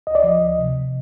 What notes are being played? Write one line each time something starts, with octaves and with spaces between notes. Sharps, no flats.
D2 D#5
D5
F3 D#5
D2
C3